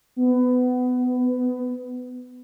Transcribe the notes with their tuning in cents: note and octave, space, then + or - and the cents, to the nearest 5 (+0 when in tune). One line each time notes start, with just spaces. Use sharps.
B3 +20